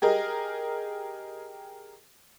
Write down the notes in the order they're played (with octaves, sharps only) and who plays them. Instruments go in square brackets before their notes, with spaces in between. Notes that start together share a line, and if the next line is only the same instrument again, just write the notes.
[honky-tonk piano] G4 G#4 A#4 D#5